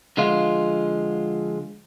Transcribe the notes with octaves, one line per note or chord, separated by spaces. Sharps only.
D3 F3 G#3 F4